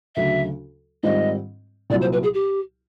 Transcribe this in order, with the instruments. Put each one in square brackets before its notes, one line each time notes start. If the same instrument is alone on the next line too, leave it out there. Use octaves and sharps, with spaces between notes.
[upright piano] D2 C#3 F#3 [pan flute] E5
[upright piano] G#2 D#3 G3 C4 F4 [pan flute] D#5
[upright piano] C2 A#2 F#3 [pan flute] D5
[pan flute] C5
B4
G#4
G4